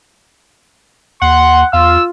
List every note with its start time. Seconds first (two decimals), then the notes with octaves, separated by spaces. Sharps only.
1.21 D#2 F#5 C6
1.73 E2 F4 E6